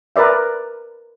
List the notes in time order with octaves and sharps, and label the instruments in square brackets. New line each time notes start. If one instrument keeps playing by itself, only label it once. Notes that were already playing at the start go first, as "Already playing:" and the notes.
[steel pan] A#4 B4 D5 E5